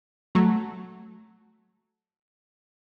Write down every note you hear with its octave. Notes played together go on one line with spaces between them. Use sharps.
F#3 A3